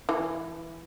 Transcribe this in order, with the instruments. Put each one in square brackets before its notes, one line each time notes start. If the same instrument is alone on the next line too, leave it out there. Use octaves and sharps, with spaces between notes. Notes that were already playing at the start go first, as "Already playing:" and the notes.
[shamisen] E3